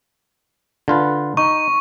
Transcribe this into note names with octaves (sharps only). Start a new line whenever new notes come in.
D3 F4 B4
D#4 C#6